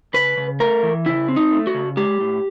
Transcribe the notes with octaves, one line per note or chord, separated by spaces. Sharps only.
C#3 B4
C#3
A3 A#4
E3
C#3 E4
C4
D#4
A3
F#4
C#3
G#3 G4
A2